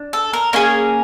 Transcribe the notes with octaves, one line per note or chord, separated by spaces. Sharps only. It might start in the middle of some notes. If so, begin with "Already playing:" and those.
Already playing: D4
A4
A#4
A#3 C#4 G#4 A#4